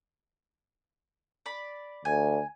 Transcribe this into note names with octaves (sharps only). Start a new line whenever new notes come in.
D5 B5
D2 G#5